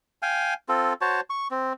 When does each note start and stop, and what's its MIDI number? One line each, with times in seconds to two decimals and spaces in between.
0.22 0.54 77
0.22 0.54 79
0.22 0.54 80
0.69 0.93 60
0.69 0.93 65
0.69 0.93 69
1.01 1.21 66
1.01 1.21 72
1.01 1.21 73
1.01 1.21 81
1.30 1.47 85
1.51 1.73 60